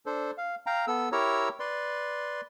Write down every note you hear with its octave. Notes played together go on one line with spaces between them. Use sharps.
D4 A4 C5
F5
F5 G5 A#5
B3 A4 E6
E4 G4 A#4 C#5 A#5 E6
B4 D5 C6